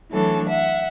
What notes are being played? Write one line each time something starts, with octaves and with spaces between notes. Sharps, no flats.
E3 F#3 A3 D4 A4 C#5
E5 F#5